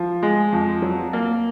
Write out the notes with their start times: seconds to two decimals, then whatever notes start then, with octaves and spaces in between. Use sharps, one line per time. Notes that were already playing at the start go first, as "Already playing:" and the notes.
Already playing: F3
0.23 G#3
0.53 F2
0.82 F#3
1.13 A#3